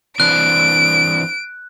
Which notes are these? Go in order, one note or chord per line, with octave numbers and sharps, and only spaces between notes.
E3 C4 D4 F#6 D7